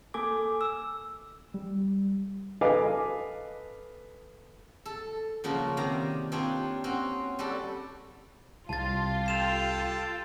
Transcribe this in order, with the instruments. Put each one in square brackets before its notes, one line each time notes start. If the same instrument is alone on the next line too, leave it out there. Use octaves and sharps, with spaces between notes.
[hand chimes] A#3 A4 G#5 D6
E6
[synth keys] G3
[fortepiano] A4 B4 D#5 F5 G#5 D6
[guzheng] A4
C#3 F3 A#3 F#4
C3 D#3 D5 F5 A#5
C4 D4 D#4 F4 G4 C#5
C4 C#4 F#4 C5
G3 F#4 G4 A4
[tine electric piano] C2 [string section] F4 G4 [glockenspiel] A5 A6
[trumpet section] A4 G5 A5 [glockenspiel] C7 E7 F7